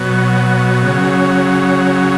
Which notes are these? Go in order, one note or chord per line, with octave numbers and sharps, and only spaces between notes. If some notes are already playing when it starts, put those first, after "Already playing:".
Already playing: B2 F#3
C#3 F#3